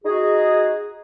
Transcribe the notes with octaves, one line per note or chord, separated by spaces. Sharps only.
D#4 F#4 G#4